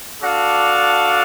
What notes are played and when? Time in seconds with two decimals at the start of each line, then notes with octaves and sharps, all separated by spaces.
0.22 D4 F#4 A4 D5 F5